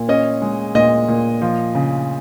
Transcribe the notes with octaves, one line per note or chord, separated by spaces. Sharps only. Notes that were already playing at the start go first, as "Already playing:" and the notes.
Already playing: A#2
C#4 D#5
G#3
A#2 D#5
A#2
F3
C#3